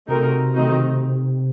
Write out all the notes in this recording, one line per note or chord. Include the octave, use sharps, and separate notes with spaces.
C3 A3 C4 D#4 F#4 A#4
D#3 A3 C4 D#4 F#4